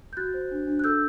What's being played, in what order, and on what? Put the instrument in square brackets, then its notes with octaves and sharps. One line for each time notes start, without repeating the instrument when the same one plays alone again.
[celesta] G6
F#4 F#6 A6
C5
D4
D4
F#6
A4 E6 G6